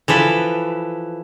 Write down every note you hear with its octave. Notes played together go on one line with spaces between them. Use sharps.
E3 F3 A4 B4